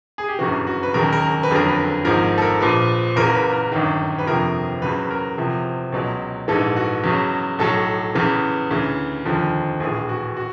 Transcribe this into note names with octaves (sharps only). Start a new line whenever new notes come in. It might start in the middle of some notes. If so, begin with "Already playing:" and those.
G#4
G4
G1 F#2 C#3 E3 F#4
F#4
B4
E1 D#2 C#3 F#3 A#4
A#4
B4
F#1 F2 D3 F#3 A#4
B4
G#1 G#2 F3 A#4
A4
A#4
A#1 A#2 F3 B4
F#1 E2 C#3 E3 A#4
B4
A#4
G1 F#2 D#3
B4
G1 F2 C3 F3 A#4
E2 C#3 F#3 B4
A#4
E2 C3 F3
C#2 B2 F#3
A#1 G#2 E3 A4
F#4
E2 C#3 F#3
B1 A2 F#3 A4
E2 C#3 E3
D2 C#3 E3
F1 D#2 D3 F3
A#1 A2 E3 G#4
F#4
F#4